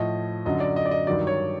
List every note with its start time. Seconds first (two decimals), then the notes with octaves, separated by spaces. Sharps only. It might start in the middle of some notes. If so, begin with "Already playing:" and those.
Already playing: A2 F3 D#5
0.45 F#2 D3 F#3 D#5
0.60 D5
0.76 D#5
0.85 D5
0.91 D#5
1.07 G2 D#3 F#3 D5
1.27 C#5